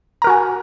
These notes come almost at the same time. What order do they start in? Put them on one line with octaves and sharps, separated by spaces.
A#5 A#4 F#4 G#5